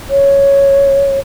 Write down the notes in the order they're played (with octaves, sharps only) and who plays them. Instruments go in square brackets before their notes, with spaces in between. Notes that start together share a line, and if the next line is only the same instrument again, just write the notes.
[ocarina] C#5